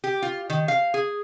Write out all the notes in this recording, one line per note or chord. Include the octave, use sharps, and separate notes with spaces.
G4
F4
D#3
F5
G#4